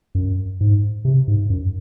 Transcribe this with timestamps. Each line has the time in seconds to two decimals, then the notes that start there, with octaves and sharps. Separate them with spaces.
0.15 F#2
0.61 G#2
1.05 C3
1.28 G#2
1.50 F#2